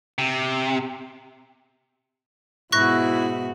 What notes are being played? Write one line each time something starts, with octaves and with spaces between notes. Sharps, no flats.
C3
G#2 B2 E4 F#4 C#6 F#6 A#6